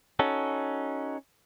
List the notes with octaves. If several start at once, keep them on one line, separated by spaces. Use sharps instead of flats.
C#4 D#4 F#4 A4